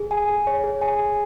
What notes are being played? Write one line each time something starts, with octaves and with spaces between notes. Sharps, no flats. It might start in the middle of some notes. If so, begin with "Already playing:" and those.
Already playing: G#4
G#5
G#4
C#5
G#4
G#5
G#4